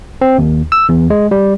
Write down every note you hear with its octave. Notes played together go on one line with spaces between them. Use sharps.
C4
D#2
E6
E2
G#3
G3